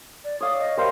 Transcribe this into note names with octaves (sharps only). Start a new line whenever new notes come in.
D5
C#5 F5 D6 D#6
D#5
G3 A#4 C5 F5